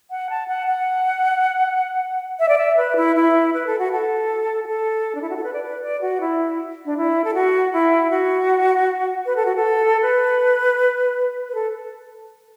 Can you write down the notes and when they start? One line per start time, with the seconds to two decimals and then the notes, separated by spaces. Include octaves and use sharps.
0.11 F#5
0.30 A5
0.48 F#5
0.67 F#5
2.39 E5
2.49 D5
2.58 E5
2.77 B4
2.96 E4
3.16 E4
3.54 B4
3.67 A4
3.79 F#4
3.92 A4
4.64 F#4
4.67 A4
5.15 D4
5.22 E4
5.30 F#4
5.37 A4
5.44 B4
5.53 D5
5.63 B4
5.82 D5
6.01 F#4
6.21 E4
6.86 D4
6.97 E4
7.24 A4
7.34 F#4
7.73 E4
8.11 F#4
9.26 B4
9.36 A4
9.46 F#4
9.56 A4
10.02 B4
11.49 B4
11.55 A4